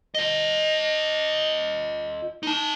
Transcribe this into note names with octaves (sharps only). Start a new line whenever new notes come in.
F4 D#5
D#4 A5